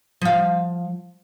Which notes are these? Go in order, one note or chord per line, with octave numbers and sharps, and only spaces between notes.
F3 F5